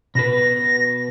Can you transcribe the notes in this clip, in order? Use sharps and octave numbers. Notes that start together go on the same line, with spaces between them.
B2 F#4 B4 A#6